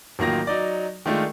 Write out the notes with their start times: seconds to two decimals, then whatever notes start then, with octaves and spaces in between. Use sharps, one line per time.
0.19 A1 D#3 F#3 A#3 F4 A#6
0.47 F#3 D#4 D5
1.06 D#3 G#3 A3 D4 F4